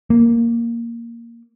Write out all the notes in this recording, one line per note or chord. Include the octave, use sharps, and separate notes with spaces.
A#3